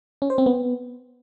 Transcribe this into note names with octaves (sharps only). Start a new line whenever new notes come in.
C#4
C5
C4
B3